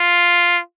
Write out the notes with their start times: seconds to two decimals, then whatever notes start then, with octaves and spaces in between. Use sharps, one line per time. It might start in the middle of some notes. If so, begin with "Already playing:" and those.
Already playing: F4